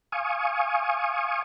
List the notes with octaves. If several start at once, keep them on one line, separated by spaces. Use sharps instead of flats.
F5 G#5 C#6 D#6